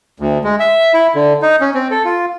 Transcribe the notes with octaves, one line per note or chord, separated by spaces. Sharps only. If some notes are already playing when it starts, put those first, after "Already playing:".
D2
G#3
E5
E4
D3
D#4
C#4
C4
A4
F4